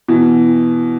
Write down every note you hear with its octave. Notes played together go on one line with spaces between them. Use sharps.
B2 E3